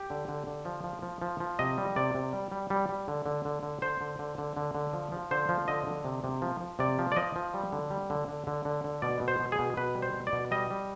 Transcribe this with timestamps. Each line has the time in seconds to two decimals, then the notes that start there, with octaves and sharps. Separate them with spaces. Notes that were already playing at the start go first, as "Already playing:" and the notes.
Already playing: G4
0.10 D3
0.28 D3
0.47 D3
0.65 F3
0.84 F3
1.02 F3
1.22 F3
1.40 F3
1.59 C3 D#5
1.78 G3
1.96 C3 D5
2.15 C3
2.33 G3
2.52 G3
2.70 G3
2.89 G3
3.08 D3
3.26 D3
3.45 D3
3.63 D3
3.82 D3 C5
4.01 D3
4.19 D3
4.38 D3
4.57 D3
4.75 D3
4.93 F3
5.12 F3
5.31 D3 C5
5.49 F3
5.68 D3 D#5
5.87 D3
6.05 C3
6.24 C3
6.42 F3
6.61 F3
6.79 C3 D5
6.99 F3
7.12 D5
7.16 F3 D#5
7.36 F3
7.54 G3
7.73 D3
7.90 G3
8.10 D3
8.28 D3
8.47 D3
8.65 D3
8.84 D3
9.02 B2 D5
9.21 B2
9.28 C5
9.39 B2
9.52 G#4
9.59 B2
9.77 B2 B4
9.95 G3
10.02 C5
10.14 B2
10.27 D5
10.33 B2
10.51 G3 D#5
10.70 G3